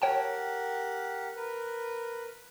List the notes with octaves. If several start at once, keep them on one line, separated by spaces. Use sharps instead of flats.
G4 A#4 C#5 F#5 G5 A5
A#4 B4